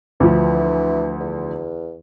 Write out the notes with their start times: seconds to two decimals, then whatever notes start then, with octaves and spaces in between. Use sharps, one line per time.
0.20 D2 E3 F3
1.20 E2